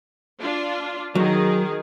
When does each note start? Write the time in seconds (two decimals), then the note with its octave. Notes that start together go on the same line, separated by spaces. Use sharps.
0.41 D4 F4
1.15 D#3 F#3 G#4